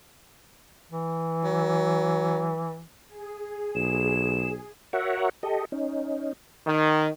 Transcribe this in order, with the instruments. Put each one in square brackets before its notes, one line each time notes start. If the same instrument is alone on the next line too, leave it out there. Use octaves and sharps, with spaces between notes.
[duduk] E3
[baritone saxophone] F#3
[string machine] G#4
[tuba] B1 [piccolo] E7
[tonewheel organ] F#4 A#4 C#5 E5 F#5
G4 A4 D#5
C#4 D#4
[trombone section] D#3